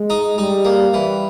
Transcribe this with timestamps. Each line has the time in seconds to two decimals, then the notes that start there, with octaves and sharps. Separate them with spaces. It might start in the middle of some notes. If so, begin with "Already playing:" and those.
Already playing: G#3
0.10 D#4
0.38 G3 D#4
0.65 A#3
0.93 E3 G3